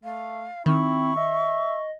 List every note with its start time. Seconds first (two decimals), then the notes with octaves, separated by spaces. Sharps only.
0.04 A3 F5
0.66 D#3 C4 E4 C#6
1.16 D#5 E5